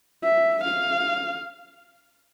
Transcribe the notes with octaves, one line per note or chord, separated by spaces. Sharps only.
E5
F5